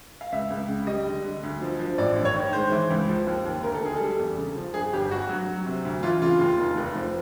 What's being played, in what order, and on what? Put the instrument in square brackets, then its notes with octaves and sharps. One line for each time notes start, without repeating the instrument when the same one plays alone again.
[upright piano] F5
C#2 E5
C#2
C#3
G3 D#5
D3
D3
D2
F3
F3
A1 D5
G2
C#5
D#3
G#3 C5
E3
C#2
F3
D#2
D#2
D2 A#4
A4
D3 G#4
G3 A4
E2
C#3
F3
G2 G#4
G1 G4
G2 F#4
F#3
F#3
C3
D2
E3 F4
C#3 F4
D#2
F1
F1
F3